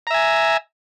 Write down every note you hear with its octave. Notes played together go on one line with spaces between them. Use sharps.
E5 G#5 A#5